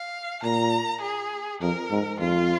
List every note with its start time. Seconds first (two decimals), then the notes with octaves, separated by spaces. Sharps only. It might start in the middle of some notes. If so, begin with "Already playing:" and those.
Already playing: F5
0.43 A#2 A#5
1.02 G#4
1.61 F2 A#4
1.91 G#2
2.20 F2 F4